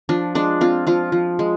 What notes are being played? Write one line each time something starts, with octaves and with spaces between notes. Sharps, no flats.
F3 D4
G#3 D4
C4 F4
F3 F4
F3
G#3